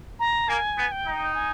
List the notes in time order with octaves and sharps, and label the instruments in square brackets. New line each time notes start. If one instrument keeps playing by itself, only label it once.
[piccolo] A#5
[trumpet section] A#3 [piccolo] G#5
[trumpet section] B3
[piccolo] G5
[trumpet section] D#4
[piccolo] G#5